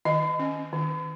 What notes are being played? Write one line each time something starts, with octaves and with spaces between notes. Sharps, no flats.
D#3 D#5
C#4
D#3